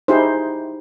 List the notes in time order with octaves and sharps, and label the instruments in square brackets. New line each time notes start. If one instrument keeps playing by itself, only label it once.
[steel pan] D#4 E4 G4 G#4 C5